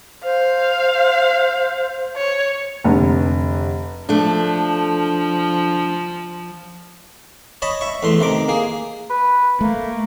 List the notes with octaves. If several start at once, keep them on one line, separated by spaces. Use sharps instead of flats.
C5 F5
C#5
F1 D3
F3 A3 D4
C#5 D#5 A5 B5
E5 C#6
E2 A3 C6
C3 D#3 D6
A#3 G#4
B4
A3 A#3